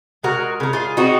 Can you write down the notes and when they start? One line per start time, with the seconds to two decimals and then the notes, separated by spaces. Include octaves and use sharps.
0.23 G#3 F#4 A#4
0.60 C#3 A#4
0.73 F4 G#4
0.97 C4 D#4 F#4